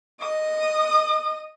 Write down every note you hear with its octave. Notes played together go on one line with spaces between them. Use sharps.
D#5 D#6